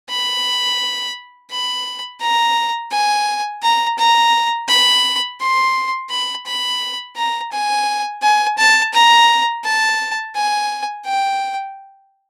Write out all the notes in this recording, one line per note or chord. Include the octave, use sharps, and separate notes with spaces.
B5
B5
A#5
G#5
A#5
A#5
B5
C6
B5
B5
A#5
G#5
G#5
A5
A#5
A5
G#5
G5